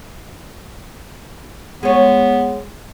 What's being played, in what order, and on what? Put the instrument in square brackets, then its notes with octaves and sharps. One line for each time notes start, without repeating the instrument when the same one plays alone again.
[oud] G#3 C#5 [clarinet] B3